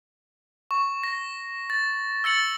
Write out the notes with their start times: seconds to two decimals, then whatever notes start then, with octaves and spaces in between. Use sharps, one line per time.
0.71 C#6
1.04 A#6
1.70 A6
2.24 E6 A6 C#7 F#7